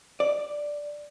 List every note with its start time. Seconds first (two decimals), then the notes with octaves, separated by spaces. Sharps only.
0.20 D5